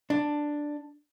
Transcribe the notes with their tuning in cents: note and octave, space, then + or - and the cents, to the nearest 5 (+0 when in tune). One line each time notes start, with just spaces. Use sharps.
D4 +5